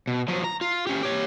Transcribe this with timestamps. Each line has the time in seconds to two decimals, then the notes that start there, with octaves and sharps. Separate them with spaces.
0.07 B2
0.28 F3 F#3
0.44 A#5
0.61 F4
0.87 C#4 G4
1.03 G4 C#5